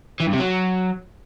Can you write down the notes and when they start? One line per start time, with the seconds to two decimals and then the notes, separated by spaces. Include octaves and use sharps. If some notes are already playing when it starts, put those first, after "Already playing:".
0.21 E3
0.27 G2
0.34 C3
0.40 F#3